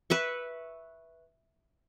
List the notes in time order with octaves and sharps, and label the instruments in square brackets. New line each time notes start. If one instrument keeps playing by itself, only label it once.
[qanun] B4 E5 C#6